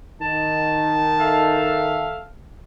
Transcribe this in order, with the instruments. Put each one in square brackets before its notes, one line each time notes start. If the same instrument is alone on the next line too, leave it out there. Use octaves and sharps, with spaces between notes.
[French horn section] D#3 D#4 [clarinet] A5
[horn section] A4 E5 F5